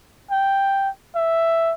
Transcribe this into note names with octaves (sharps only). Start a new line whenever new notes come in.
G5
E5